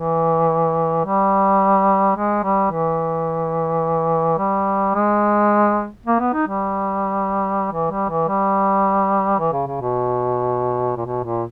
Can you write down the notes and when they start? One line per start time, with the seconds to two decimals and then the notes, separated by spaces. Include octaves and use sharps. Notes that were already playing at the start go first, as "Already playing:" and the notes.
Already playing: E3
1.05 G3
2.16 G#3
2.44 G3
2.72 E3
4.38 G3
4.95 G#3
6.06 A#3
6.20 B3
6.33 D#4
6.47 G3
7.72 E3
7.91 G3
8.09 E3
8.28 G3
9.39 E3
9.53 C#3
9.67 C#3
9.81 B2
10.97 A#2
11.06 B2
11.24 A#2